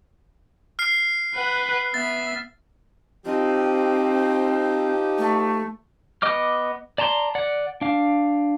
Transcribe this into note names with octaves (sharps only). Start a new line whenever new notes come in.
F6 C7
B4 F#5
B3 E5 A6
F3 C4 D#4 G4
A3
B3 D#5 D6 F6
D5 A5 A#5 C6
D5 F#5
D4 F5